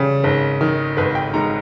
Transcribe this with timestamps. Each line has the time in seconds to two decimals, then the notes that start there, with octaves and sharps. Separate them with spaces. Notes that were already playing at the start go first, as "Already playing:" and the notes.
Already playing: C#3 G3
0.24 G#1
0.61 D#3
0.97 G#1 B4
1.15 G5
1.34 G#2 A#5